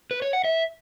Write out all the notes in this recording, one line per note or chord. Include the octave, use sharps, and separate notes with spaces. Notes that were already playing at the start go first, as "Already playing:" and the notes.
B4
C#5
F#5
E5